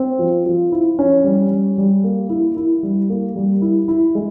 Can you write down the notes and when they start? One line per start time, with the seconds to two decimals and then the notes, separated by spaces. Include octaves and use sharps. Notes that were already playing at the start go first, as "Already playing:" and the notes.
Already playing: C4
0.19 F3
0.46 F3
0.72 E4
0.99 C#4
1.24 G3
1.51 G3
1.78 G3
2.04 A#3
2.29 E4
2.57 E4
2.83 G3
3.09 A#3
3.36 G3
3.62 E4
3.88 E4
4.15 G#3